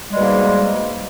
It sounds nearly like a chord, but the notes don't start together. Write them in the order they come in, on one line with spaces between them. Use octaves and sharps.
G3 G#3 B2 A#3 G#2